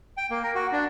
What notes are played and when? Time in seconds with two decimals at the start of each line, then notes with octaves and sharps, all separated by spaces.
0.17 G5
0.30 A#3
0.43 A#4
0.55 F#4
0.72 D4